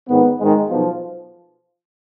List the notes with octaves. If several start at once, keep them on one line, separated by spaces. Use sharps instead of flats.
G#1 G#2 D#3 B3
G#1 G#2 D#3 G#3
B1 B2 F3